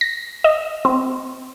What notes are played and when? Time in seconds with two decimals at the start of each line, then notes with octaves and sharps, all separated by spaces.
0.01 A#6
0.44 D#5
0.85 C4